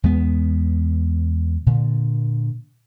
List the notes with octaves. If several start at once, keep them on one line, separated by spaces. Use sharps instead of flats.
E2 G#3 B3
A#2 D3